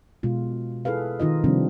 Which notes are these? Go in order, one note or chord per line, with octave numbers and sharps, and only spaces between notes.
B2 G#3 F4
E4 G#4 A4 B4 F5
D#3 D#4 F4 D#5
C3 D#3 F3 G3 C4 D4